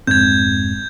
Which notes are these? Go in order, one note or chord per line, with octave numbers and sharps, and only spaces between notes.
F1 G#2 C4 G6 G#6